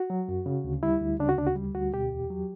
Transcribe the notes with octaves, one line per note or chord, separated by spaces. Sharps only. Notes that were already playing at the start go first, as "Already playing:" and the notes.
Already playing: F#4
F#3
F#2
C#3
D2
G3 E4
D2
C#3 D4
F#4
D2 D4
F#4
G3
D2 F#4
B2 G4
E2
F#3